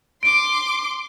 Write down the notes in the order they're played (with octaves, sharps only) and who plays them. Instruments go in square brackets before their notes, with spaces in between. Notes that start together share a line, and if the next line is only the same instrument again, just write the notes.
[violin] C6 D6 [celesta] D7